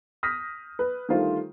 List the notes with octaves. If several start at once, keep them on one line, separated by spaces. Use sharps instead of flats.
D#6 F6 G6 A#6 B6
B4
D3 D#3 G3 A3 F4 C5